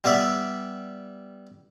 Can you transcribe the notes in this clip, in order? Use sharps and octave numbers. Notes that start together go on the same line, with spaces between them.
G3 B3 D5 E5